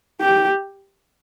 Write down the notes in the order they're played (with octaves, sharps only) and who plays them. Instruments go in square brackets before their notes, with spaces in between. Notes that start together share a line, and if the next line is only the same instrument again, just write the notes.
[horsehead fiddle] G4